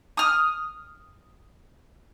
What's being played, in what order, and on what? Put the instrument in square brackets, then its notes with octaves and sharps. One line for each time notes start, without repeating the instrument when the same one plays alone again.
[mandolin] D#6 F6